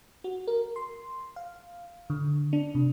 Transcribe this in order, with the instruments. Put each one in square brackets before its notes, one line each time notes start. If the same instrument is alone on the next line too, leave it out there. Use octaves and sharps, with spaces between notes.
[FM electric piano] F#4
A#4
C6
F5
D3
D4
C3